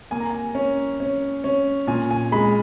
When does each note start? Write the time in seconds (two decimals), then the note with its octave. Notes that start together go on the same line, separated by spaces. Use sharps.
0.11 A#3 G#5
0.20 A#5
0.30 G#5
0.55 C#4
1.00 C#4
1.44 C#4
1.87 A#2 G#5
2.11 G#5
2.32 G#3 B5